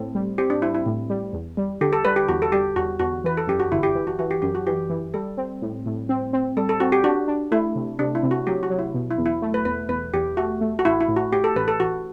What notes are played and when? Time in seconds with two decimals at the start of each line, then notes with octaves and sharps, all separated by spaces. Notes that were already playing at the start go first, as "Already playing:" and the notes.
Already playing: A2 C4 A4
0.15 G3
0.38 C4 G4
0.50 D4
0.62 C4 E4
0.74 E4
0.86 A2
1.10 G3
1.33 E2
1.57 G3
1.81 D3 G4
1.93 A4
2.05 G3 B4
2.16 G4
2.29 E2 F#4
2.42 A4
2.52 G3 G4
2.76 E2 F#4
2.99 E2 F#4
3.24 E3 B4
3.37 A4
3.47 F#2 G4
3.60 F#4
3.71 G1 E4
3.83 G4
3.95 E3
4.07 F#4
4.19 E3 F#4
4.31 G4
4.42 F#2 G4
4.55 F#4
4.67 E3 G4
4.90 E3
5.14 G3 A4
5.37 C4
5.62 A2
5.86 A2
6.09 C4
6.33 C4
6.57 G3 A4
6.69 A4
6.80 C4 F#4
6.92 G4
7.04 D4 F#4
7.28 D4
7.51 A3 E4
7.75 C3
7.99 C3 D4
8.15 E4
8.23 C3
8.31 F#4
8.47 F#3 G4
8.63 F#4
8.70 F#3
8.79 E4
8.94 B2
9.11 E4
9.18 E2
9.26 E4
9.42 A3
9.54 B4
9.65 E2 B4
9.89 E2 B4
10.14 E2 G4
10.37 A3 F#4
10.61 A3
10.79 F#4
10.85 A1 E4
11.00 E4
11.08 A2
11.16 F#4
11.32 A2 G4
11.44 A4
11.56 A1 B4
11.68 A4
11.80 A1 F#4